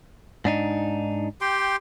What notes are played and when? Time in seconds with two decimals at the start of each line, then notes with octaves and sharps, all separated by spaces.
0.45 G#2 D4 D#4
1.41 G4 G5 C6